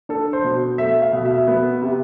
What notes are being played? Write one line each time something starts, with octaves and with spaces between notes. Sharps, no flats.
D4 A4
C5
B2
A3 E5
F5
B2
E5
B3
C3